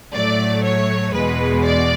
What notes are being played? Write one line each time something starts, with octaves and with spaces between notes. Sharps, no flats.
A2 F#3 A3 D5
C#5
E2 B2 G#3 B4
D5